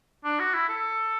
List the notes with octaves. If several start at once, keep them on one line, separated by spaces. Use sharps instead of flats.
D4
F#4
E4
A4